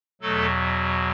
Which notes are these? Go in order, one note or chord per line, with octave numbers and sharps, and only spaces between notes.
E2 B2 F#3 A3 A4